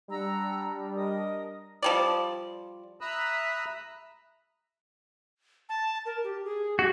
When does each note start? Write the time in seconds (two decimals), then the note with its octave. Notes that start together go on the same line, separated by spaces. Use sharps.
0.10 G3 D4 F#5 A#5 E6
0.95 A#4 D#5 D#6
1.82 F3 G3 D5
3.01 E5 A#5 B5 D#6 E6 F#6
5.69 A5
6.05 A#4
6.24 G4
6.44 G#4
6.79 F#4 G4